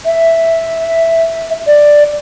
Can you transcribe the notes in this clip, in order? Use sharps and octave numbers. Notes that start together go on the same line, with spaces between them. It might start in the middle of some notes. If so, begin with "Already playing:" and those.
E5
D5